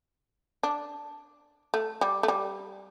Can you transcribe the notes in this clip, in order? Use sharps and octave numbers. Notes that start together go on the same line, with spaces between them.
D4
A3
G3
A3
G3